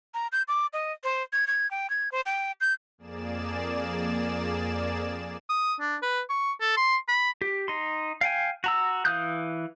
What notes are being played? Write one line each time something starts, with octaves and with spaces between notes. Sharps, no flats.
A#5
G6
D6
D#5
C5
G#6
G#6
G5
G#6
C5
G5
G6
F2 A#3 G#4 D5 E7
D#6
D4
B4
C#6
A4
C6
B5
G4
D#4 C6
F5 G5 G#5
F#4 A#5 E6
E3 F5 D#6 F#6 G6